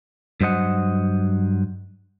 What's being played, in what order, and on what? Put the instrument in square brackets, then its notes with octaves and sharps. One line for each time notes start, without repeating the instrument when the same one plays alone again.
[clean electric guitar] G2 F#3 C5 D#5 F#5